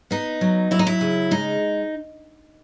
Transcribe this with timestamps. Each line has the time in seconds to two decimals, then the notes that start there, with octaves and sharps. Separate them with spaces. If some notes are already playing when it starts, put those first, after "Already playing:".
0.11 B3 D#4
0.41 F#3
0.71 F#3 E4
0.79 D#4
0.87 E4
1.01 C#3
1.31 G#3 D#4